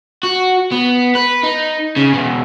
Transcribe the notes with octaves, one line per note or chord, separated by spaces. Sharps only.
F#4
B3
B4
D#4
C#3
E2 B2